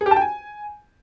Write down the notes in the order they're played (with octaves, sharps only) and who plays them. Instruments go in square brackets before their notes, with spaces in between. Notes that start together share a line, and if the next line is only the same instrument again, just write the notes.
[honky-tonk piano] G#4
G4
A5
G5
G#5